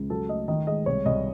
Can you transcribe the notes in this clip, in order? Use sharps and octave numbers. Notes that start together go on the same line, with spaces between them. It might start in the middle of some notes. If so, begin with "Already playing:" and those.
Already playing: C#2
F#3 A4
A3 D#5
D#3 D#5
G#3 D#5
C2 C#5
C2 D#5